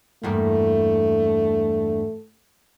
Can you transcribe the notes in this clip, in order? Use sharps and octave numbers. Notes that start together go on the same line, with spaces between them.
E2 G2 A3 A#3